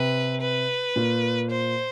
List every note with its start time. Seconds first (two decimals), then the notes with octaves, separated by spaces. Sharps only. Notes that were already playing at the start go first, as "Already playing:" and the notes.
Already playing: C3 B4
0.41 B4
0.96 A#2
1.51 C5